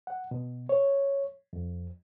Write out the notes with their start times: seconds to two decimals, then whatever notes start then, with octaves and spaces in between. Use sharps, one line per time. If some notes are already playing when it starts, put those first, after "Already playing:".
0.07 F#5
0.31 B2
0.69 C#5
1.53 F2